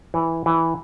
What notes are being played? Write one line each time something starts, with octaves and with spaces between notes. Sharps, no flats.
E3
E3